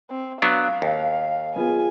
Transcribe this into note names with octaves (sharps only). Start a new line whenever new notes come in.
C4
F#3 B3 D4 F5
D#2
B3 F4 G#4 G#5